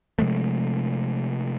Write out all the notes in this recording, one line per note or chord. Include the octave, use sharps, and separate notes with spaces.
C3 F3 G#3 A3